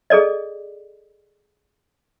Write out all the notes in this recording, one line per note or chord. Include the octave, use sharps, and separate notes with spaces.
G#4 A4 D5 D#5